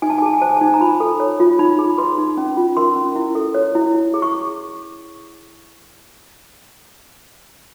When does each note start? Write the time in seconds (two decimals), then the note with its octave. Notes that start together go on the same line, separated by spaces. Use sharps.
0.02 D#4 G#5
0.10 A5
0.18 G#5
0.22 G#4 A5
0.33 G#5
0.41 C5 A5
0.49 G#5
0.57 A5
0.61 D#4 G#5
0.74 A#5
0.81 F4 B5
1.00 A4
1.20 C#5
1.40 F4
1.59 D#4 B5
1.79 G#4
1.98 B4 C6
2.18 D#4
2.37 C#4
2.57 F4
2.77 A#4 C6
2.96 C#4
3.16 E4
3.35 A4
3.55 C#5
3.75 E4
3.94 E4
4.14 G#4
4.22 C#6